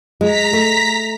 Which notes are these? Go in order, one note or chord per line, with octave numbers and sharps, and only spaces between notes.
G#3 A#5 B6
A3